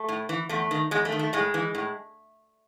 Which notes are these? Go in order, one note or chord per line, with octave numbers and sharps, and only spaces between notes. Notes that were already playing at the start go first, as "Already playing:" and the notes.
Already playing: A3
A2
E3
E2 A3
D#3
E2 G#3
A3
D#3
A3
A2 G#3
E3
A2